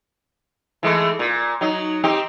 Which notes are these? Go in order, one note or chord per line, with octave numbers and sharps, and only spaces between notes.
E3 G#3 A3
A#2
F#3 D#4
C4 D#4 G4